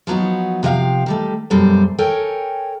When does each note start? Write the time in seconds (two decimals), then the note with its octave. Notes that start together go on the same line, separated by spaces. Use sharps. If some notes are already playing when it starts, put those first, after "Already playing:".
0.07 F3 F#3 B3 D#4 F#4
0.63 C3 F3 D#5 F5 G5
1.06 D#3 G3 A3
1.50 F#2 B2 G3 A4 C5
1.98 A4 A#4 C#5 G5 G#5